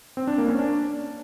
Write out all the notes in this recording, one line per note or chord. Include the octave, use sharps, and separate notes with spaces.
C4
D4
A#3
C#4
D4